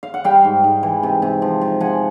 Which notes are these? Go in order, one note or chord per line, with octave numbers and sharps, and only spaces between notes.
F5
F#5
G3 F5 G5
G#2
G#2
E3
C3
C3
F3
F3
F3 F#5 G#5